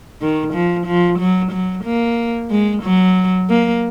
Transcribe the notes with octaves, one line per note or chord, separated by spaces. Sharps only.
D#3
F3
F3
F#3
F#3
A#3
G#3
F#3
A#3